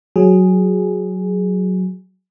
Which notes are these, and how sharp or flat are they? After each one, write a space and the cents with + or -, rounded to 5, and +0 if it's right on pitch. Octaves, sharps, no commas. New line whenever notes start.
F#3 +0 G#4 +0